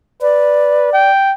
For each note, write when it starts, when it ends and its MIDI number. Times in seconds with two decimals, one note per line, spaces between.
0.22 0.92 71
0.22 1.11 74
0.93 1.33 79